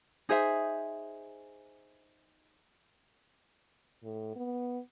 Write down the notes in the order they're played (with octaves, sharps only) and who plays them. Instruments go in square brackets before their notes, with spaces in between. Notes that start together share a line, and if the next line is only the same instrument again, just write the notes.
[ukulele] D#4 G#4 C5 E5
[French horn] A2
B3